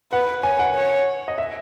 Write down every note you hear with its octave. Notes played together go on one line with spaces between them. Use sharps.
B4 F#5
C#5 G#5
F#5
C#5
D#5
E5